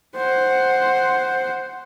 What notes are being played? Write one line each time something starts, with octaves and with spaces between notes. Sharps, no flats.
C5 F#5